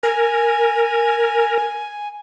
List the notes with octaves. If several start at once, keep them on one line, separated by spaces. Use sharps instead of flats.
A#4 G#5